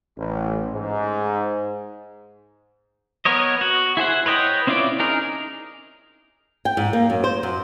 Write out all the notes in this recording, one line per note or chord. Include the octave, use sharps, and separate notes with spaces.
A1
G#2
B3 A#4 C#5 D#5
F#4
E4 G#4 C5 F#5
B4 C#5 D#5 G5
C4 C#4 E4 F4 D5
D#4 G#4 A#4
G5
G#2
A#3
F#2
C5
F#2